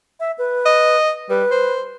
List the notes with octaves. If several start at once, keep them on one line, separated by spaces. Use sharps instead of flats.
E5
B4
D#5
G3 B4
C5